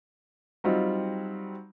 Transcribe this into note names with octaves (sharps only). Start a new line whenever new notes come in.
F#3 G3 C4 D#4 F4